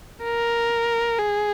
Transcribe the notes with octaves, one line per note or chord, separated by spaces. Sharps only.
A#4
G#4